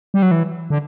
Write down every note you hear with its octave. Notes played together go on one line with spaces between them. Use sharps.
G3
F#3
E3
D3